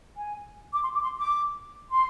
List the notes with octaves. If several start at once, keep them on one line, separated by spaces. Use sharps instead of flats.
G#5
D6
C6
D6
C6
D6
C6